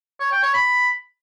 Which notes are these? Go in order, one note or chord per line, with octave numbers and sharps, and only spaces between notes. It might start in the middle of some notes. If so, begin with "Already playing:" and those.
C#5
G5
C#5
B5